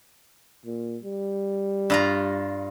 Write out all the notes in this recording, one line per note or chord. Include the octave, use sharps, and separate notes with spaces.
A#2
G3
G2 F4 A#5